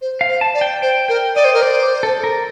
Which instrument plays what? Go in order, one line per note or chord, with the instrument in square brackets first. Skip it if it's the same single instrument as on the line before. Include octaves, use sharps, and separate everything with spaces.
[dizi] C5
[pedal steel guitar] F5
[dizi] C5
[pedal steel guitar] A5
[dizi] D5
[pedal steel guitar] G5
[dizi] C5 [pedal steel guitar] G5
[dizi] A#4 [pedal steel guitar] G5
[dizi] D5 [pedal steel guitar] D#5
[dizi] C5
A#4
[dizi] C5 [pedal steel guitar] D5
[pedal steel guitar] A4
A#4